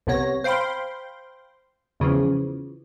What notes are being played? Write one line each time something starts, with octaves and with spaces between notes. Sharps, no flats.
C2 C3 B3 C#5 A#6
C5 F5 G5 B5 C6
E2 C#3 E3 F3